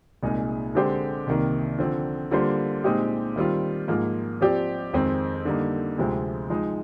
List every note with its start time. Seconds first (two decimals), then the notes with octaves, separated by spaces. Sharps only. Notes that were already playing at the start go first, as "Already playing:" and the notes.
0.23 C2 A#2 G#3 D#4 G#4
0.75 D3 G#3 C4 G4 C5
1.27 C2 C3 D#3 A#3
1.79 D3 F3 C4
2.31 D3 G3 A#3 F4 C5
2.84 A#2 G#3 C4 D#4 G4
3.36 D#3 G3 C4 F4
3.88 G#2 F3 A#3
4.41 F3 C4 G4 D5
4.93 F2 D#3 G#3 C4
5.45 D3 G3 A#3 D#4
5.98 D2 C3 F3 G#3 C4
6.50 F3 G#3 D#4